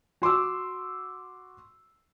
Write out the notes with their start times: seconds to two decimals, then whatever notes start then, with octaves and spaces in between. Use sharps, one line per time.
0.22 F#4 C6 D6 E6